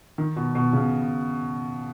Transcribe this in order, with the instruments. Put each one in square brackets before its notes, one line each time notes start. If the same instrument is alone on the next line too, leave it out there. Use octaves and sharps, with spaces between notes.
[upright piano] D#3
B2
B2
C#3